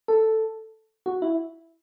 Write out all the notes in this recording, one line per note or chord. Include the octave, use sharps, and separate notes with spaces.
A4
F#4
E4